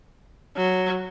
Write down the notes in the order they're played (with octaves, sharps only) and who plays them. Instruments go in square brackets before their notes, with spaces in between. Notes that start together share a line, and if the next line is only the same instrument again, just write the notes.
[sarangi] F#3